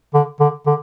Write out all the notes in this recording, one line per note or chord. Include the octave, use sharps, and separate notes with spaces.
D3
D3
D3